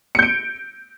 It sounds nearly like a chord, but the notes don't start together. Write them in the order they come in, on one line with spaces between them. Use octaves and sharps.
C#7 G6 D7